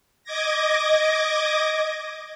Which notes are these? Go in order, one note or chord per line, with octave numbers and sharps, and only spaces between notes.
D#5 D6 G#6 A#6